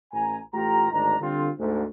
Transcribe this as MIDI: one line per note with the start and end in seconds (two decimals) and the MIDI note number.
0.13 0.38 33
0.13 0.38 80
0.13 0.38 82
0.54 0.88 33
0.54 0.88 57
0.54 0.88 65
0.54 0.88 67
0.54 0.88 82
0.92 1.19 32
0.92 1.19 38
0.92 1.19 62
0.92 1.19 63
0.92 1.19 82
1.20 1.50 50
1.20 1.50 55
1.20 1.50 60
1.20 1.50 65
1.59 1.85 38
1.59 1.85 44